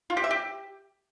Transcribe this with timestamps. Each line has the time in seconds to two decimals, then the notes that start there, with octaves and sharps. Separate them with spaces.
0.10 F4
0.17 G4
0.24 E5
0.31 G4